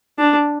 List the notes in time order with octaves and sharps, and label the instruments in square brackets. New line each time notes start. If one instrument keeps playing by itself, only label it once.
[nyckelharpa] D4